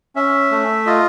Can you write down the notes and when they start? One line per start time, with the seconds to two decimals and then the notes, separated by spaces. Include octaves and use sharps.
0.16 C#4 E5
0.51 A3
0.86 F4 D#5